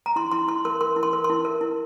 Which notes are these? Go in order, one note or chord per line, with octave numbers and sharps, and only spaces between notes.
A#5
E4 C6
E4 C6
E4 C6
A#4 C6
A#4 C6
E4
C6
A#4
C6
E4
A#4
E4